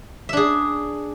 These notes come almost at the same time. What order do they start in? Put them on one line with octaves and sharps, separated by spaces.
E5 D4 G#4